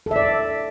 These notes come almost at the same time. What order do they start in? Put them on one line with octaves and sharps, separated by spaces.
A4 E5 D5